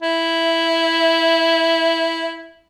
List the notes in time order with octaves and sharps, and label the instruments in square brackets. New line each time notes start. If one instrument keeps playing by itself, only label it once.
[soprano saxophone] E4 [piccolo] E5